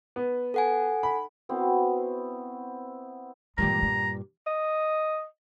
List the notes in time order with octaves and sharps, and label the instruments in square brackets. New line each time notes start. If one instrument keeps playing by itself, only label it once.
[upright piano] B3
[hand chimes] A4 F#5 G#5
[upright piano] B5
[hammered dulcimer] B3 C4 E4 F#4
[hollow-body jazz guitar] G2 A#2 G4 [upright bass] E3 G#3 [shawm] A#5
[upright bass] F4
[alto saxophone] D#5